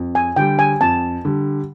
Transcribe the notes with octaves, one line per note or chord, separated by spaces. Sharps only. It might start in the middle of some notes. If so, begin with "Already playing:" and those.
Already playing: F2
G#5
D3 G3 G5
G#5
F2 A5
D3 G3